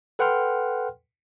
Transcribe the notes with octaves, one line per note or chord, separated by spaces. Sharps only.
A4 B4 F#5 G5 C6 F6